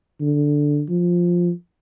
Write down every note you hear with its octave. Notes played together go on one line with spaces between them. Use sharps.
D3
F3